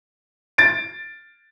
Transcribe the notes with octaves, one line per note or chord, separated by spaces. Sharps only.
A6 D7